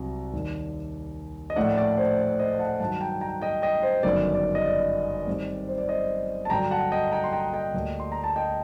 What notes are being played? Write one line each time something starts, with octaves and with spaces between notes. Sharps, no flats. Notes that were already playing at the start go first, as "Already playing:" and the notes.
Already playing: C2 C3 F#3
D#2 D#3 G3 D4
D#5
A#1 A2 A3 D4 D5 F#5
D5
C5
C5
C5 D#5
F#5 A5
G2 D#3 F#3 F#5 A5
G5 A#5
G5 A#5
D#5 G5
D#5 G5
C5
G1 F#2 D#3 F#3 D5
D5
D#5
D5
G2 D#3 G3 C4
C5
D5
C5 D#5
A5
G2 D3 F#3 G5 A#5
F#5 A5
D#5 G5
G5 A#5
C6
G5 A#5
D#5 G5
D2 D3 G3 A#3 D4
C6
A#5
A5
D#5 G5